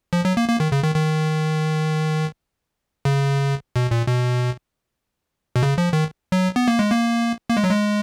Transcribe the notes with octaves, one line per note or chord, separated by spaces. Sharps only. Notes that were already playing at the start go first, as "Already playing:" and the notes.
F3
F#3
A#3
A#3
D#3
C#3
D#3
D#3
C#3
B2
A#2
B2
B2
C#3
F3
D#3
F#3
B3
A#3
G#3
A#3
A#3
G#3
F#3
G#3